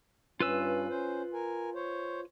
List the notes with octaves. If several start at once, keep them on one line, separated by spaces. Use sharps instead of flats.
G2 C#4 F4 B4 E6
C#4 C5
A#4 G#5
C5 C#5